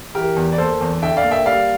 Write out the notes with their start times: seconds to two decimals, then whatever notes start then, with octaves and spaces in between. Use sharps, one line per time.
0.15 E3 G4 A#4
0.36 E2
0.52 D5
0.58 A#3 A4 C5
0.81 E2
1.02 D3 E5 G5
1.17 D5 F5
1.24 A#3
1.31 E5 G5
1.46 G3 D5 F5